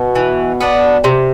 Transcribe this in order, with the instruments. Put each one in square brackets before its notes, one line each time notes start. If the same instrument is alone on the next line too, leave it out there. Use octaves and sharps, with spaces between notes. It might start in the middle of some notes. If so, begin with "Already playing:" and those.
Already playing: [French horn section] B2
[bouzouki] E3
B3 D4
C3